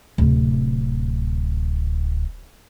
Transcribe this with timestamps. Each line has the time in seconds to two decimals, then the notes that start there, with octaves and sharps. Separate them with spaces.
0.18 D1 C3